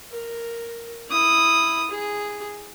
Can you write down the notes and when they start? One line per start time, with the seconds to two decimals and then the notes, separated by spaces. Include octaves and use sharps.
0.12 A#4
1.09 E4 D#6
1.91 G#4